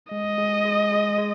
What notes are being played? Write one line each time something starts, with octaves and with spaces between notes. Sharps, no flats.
G#3 D#5
G#3
G#3
G#3
G#3